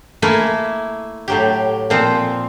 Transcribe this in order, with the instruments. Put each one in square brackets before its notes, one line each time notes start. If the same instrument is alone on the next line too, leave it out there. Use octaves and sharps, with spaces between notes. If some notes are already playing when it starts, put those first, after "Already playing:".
[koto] A3 A#3 E4 G#5
A2 F#3 G4
A#2 F3 C4